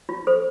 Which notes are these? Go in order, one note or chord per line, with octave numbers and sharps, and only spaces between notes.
F4
A4 C5